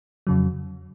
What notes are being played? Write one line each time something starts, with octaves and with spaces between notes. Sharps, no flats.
F2 C#3 F#3